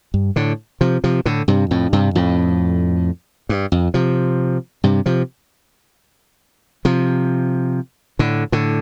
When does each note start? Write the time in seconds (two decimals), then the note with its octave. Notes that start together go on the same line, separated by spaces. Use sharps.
0.14 G2
0.36 A2 D3
0.81 C3 F3
1.04 C3 F3
1.26 A2 D3
1.48 G2 C3
1.71 F2 A2
1.93 G2 C3
2.15 F2 A2
3.49 G2
3.72 F2
3.94 C3 F3
4.84 G2 C3
5.06 C3 F3
6.85 C3 F3
8.19 A2 D3
8.52 A2 D3